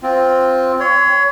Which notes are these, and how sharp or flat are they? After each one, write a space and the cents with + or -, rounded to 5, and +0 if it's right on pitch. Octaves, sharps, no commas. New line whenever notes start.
C4 +0 F4 +0
C#5 +20 C6 -30